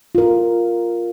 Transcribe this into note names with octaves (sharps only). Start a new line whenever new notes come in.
F4 A#4